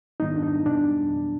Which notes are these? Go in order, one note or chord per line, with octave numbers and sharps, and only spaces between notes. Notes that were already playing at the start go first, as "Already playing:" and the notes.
G#2 D#3 G3 B3 D#4
D4
D#4
B2 G3 B3 D4